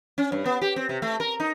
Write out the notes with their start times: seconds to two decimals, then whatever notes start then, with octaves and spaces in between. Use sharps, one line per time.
0.18 C#4
0.32 G2
0.46 B3
0.61 G4
0.76 C4
0.89 C3
1.02 A3
1.20 A#4
1.40 D#4